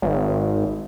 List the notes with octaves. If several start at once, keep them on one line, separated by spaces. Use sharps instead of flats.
G#1